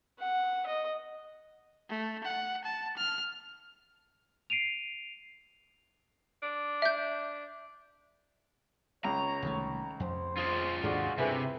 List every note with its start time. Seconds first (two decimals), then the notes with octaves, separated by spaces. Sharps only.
0.20 F#5
0.66 D#5
1.89 A3
2.23 F#5
2.64 A5
2.97 F6
4.50 C7 D7 D#7 F7
6.43 D4
6.82 E5 G6
9.05 C#2 C#5 A#5
9.42 C2 D#3 A3
10.00 F2 C5
10.37 F4 G#4 C5
10.83 D#2 G#2 D3 G#3 F#4 D5
11.18 G2 C3 E4 G#4 A4 B4